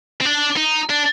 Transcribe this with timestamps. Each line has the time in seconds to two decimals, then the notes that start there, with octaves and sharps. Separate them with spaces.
0.21 C4
0.25 D4
0.57 D#4
0.90 D4